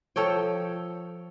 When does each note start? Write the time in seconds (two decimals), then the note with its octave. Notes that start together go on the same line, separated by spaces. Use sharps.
0.16 F3 A4 C#5 G5